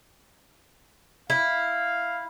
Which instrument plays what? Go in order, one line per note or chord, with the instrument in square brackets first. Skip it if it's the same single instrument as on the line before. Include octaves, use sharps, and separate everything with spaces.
[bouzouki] E4 [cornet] F5